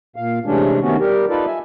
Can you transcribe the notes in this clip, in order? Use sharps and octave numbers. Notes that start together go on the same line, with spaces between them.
A#2 F5
C3 E3 G#3 A3 C#4 D4
C3 D#3 A3 B3 C#4 F#4
G3 G4 A#4
D#4 F4 A4 B4 D5
E5 G#5